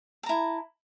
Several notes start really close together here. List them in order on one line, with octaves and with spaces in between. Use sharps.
A5 A#5 E4